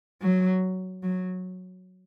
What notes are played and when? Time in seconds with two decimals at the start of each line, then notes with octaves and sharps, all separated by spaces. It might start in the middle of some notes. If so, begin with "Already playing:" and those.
0.22 F#3
1.03 F#3